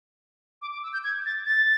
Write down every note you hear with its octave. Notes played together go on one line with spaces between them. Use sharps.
D6
D6
E6
G6
G#6
A6
A6